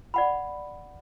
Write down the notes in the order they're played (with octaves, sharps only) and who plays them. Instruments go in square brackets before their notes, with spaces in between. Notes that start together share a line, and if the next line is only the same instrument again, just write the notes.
[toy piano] D5 F#5 B5